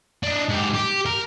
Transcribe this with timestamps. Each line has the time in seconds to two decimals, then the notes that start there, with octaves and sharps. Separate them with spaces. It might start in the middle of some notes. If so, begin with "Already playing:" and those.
0.23 D4 D#4
0.49 G#2 G4
0.74 G4
1.06 A#4